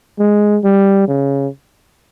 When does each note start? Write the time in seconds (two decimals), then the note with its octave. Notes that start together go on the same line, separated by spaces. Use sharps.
0.19 G#3
0.64 G3
1.08 C#3